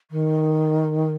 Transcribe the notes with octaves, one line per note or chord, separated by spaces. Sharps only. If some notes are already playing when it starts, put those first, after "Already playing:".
D#3